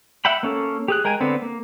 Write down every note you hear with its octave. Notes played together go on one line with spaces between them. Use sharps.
E5 F#5 G5 B5
A#3 C#4 A4
G4 G#4 F#6
G#3 A#4 G5 G#5
D3 B3 C4
A#3